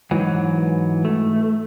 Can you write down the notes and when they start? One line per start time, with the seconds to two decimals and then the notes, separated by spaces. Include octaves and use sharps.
0.11 G#2 E3 F#3
1.05 A3